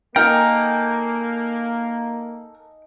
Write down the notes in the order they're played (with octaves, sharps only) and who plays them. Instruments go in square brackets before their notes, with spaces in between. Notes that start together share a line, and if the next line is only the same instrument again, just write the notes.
[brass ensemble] A#3 [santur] D#4 F5 G#5 [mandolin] A4 A#4 [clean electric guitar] G5